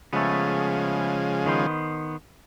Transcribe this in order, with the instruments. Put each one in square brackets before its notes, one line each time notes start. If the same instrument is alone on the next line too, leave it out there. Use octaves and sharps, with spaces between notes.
[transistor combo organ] C#3 F3 G#3 [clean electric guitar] A3 B3
[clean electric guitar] D#3 B3 C5